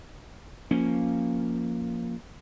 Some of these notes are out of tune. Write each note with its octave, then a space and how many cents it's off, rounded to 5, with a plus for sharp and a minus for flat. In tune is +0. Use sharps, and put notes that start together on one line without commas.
F3 +0 A#3 +0 C#4 +0